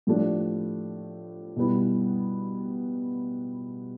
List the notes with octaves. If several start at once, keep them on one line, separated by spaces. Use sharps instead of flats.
A2 F3 A3 D4 G4
B2 G3 B3 E4